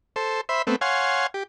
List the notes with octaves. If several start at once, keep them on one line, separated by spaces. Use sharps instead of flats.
A4 C5
C5 E5 B5
A3 B3 C4
C#5 F5 F#5 G#5 C6
G4